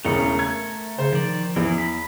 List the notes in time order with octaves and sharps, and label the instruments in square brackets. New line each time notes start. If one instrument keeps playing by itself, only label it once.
[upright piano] E1 E2 C#3 [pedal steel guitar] A3 A#4 C#6
[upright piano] G#6
[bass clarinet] C#3 [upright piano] C5
[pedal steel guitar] D#3 D5 [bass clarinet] F3
[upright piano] E2 [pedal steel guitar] E3
[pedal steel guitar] B5